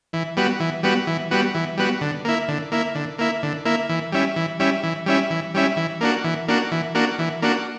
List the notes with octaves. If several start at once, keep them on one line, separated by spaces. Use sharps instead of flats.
E3
G3 B3 F#4
E3
G3 B3 F#4
E3
G3 B3 F#4
E3
G3 B3 F#4
D3
A#3 E4
D3
A#3 E4
D3
A#3 E4
D3
A#3 E4
E3
G3 C#4 E4
E3
G3 C#4 E4
E3
G3 C#4 E4
E3
G3 C#4 E4
E3
A#3 D4 F#4
E3
A#3 D4 F#4
E3
A#3 D4 F#4
E3
A#3 D4 F#4